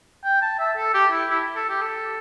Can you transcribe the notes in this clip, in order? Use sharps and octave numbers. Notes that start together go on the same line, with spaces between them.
G5
A5
E5
A4
G4
E4
E4
A4
G4
A4